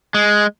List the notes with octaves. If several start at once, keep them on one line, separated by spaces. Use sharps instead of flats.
G#3